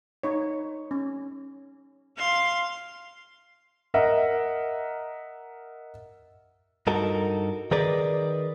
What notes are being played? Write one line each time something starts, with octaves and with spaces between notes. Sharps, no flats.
D#4 C#5
C#4
F5 C6
A#4 D#5 E5 F#5
G2 D#4 F#4 A4 A#4
D#3 G#4 A#4 B4 D5